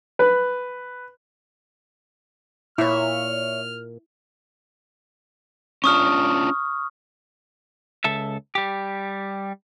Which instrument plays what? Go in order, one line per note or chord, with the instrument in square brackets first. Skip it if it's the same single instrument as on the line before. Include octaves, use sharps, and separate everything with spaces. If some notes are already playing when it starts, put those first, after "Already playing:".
[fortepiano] B4
[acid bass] A#2 [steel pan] E4 [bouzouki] C#5 E5 [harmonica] F6
[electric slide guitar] C#4 D4 F4 [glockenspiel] C#6 D#6 F6
[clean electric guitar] C#2 A4 E5
G3 G4